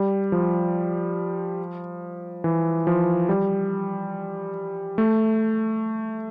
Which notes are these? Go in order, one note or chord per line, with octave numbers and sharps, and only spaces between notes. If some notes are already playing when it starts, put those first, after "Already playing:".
Already playing: G3
F3
E3
F3
G3
A3